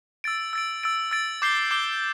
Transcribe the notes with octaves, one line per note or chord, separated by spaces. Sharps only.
E6 A6 D7
E6 A6 D7
E6 A6 D7
E6 A6 D7
D6 G6 C7 G7
D6 G6 C7 G7